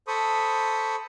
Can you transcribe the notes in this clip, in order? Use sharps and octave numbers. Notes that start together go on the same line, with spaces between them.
A4 C5 B5 C#6 D#6